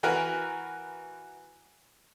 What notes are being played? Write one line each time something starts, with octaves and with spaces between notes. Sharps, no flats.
E3 F#4 A#4 B4 G#5